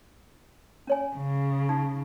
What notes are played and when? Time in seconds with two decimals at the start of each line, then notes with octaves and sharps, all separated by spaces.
0.87 C#4 C#5 G#5
1.16 C#3
1.69 D#4